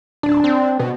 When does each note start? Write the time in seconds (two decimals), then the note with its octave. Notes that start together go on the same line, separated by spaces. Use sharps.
0.23 D1 D4
0.44 C4
0.79 B2